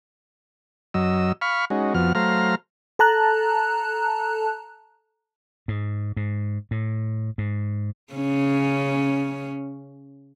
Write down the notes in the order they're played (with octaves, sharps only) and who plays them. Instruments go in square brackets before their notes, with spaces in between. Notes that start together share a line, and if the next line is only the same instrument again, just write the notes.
[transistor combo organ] F#2 F#3 D#5 E6
F5 B5 C#6 F6
G#3 C#4 D#4 F#4
F2 F3 B3 F#4 F6
F#3 A3 C5 F5 A#5 F6
[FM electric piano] A4 A5 A#5 F#6
[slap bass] G#2
G#2
A2
G#2
[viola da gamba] C#3 C#4